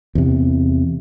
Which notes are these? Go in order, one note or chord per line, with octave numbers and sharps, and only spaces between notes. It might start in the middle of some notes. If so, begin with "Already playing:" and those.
E2 C3